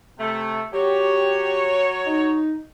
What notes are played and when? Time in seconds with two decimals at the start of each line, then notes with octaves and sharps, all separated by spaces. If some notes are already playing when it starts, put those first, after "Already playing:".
0.19 C3 A3
0.73 F#3 G4 C#5
2.07 D#4